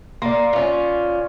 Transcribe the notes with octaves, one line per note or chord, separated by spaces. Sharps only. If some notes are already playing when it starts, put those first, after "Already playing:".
A#3 D5 C6
C#4 F4